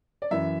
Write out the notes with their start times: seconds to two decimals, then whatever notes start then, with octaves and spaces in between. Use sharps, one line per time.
0.22 D5
0.31 F#2 E3 E5